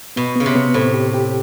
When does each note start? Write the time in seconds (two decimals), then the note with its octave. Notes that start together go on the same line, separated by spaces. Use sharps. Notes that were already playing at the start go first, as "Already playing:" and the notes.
0.16 B2 B3
0.36 C#3 B3
0.46 C3
0.55 B3
0.74 A2 C5
0.94 G4
1.14 G4